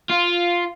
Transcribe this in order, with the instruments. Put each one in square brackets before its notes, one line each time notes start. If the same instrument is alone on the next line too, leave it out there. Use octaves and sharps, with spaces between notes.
[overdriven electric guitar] F4